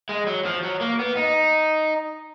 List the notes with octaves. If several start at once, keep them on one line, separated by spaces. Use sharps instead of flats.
G#3
F#3
F3
F#3
A#3
B3
D#4